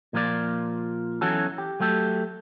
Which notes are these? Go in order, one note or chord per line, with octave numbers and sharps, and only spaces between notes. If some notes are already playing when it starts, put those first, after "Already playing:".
A#2 F3 A#3 F4 D5
E2 E3 F#3 C#4 F#4 A4
G4
F#3 A3 G4 A4